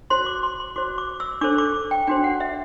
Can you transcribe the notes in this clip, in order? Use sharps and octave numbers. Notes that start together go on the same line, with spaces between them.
F#4 C5 C6
D6
C6
C6
F#4 C5 D6
D6
E6
D4 A4 C5 D6
D6
G5
D4 F#4 C5 G5
F#5
E5